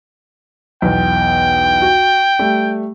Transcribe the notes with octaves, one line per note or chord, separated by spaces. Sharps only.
B1 E2 G5
F#4
G3 A3